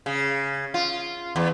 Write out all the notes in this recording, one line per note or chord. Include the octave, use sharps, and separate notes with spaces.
C#3
F4
E2